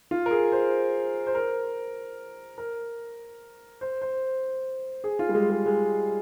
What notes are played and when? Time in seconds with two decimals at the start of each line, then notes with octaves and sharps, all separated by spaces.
0.11 F4
0.26 A#4
0.31 G#4
0.52 C5
1.27 C5
1.35 A#4
2.58 A#4
3.81 C5
4.02 C5
5.04 G#4
5.19 F4
5.29 G3
5.35 G#3
5.50 G#3
5.66 G#3